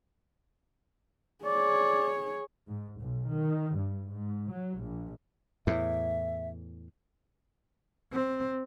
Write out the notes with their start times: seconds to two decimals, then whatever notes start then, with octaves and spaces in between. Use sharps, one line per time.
1.45 G#4 C#5 D5
2.68 G#2
3.00 B1
3.32 D#3
3.77 G2
4.11 G#2
4.50 F#3
4.81 A#1
5.67 E2 A2 E5
8.12 C4